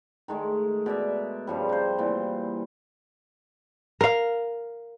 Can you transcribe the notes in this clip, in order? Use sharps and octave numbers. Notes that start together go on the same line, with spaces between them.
D#3 G#3 A3
B2 D5 E5
G2 C#3 F3 G3
C3 C5
A#2 E3 C4
A#4 F5